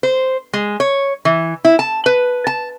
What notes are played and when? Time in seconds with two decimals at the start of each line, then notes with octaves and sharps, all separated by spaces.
0.03 C5
0.53 G#3
0.80 C#5
1.25 E3
1.65 E4
1.79 A5
2.06 B4
2.47 A5